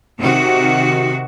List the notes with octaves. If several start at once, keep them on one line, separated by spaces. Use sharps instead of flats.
C3 D#3 F#4